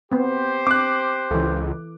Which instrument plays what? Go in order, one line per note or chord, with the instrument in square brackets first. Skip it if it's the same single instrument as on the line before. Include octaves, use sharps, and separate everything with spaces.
[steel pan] B3 C4 [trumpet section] G4 C5
[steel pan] C4 [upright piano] D6 F#6
[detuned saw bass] C#2 [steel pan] E3 A4